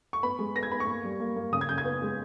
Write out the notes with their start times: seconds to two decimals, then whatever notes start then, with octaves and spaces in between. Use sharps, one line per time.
0.13 C#6
0.23 B3 B5
0.39 G#3
0.56 B3 A#6
0.63 G#6
0.71 B3 B5
0.80 C#6
0.87 A#3
1.03 G3
1.20 A#3
1.36 A#3
1.52 C#3 D#6
1.61 G#6
1.69 C#3 G6
1.78 G#6
1.85 B3
2.02 G#3